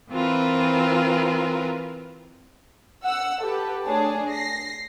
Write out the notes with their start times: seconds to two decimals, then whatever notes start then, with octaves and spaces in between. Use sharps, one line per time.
0.11 E3 C4 F4 A#4 B4
3.05 F#5 E6
3.43 G4 A4 B4
3.85 A3 D4 G#4 C#5 A5
4.28 A#6 C7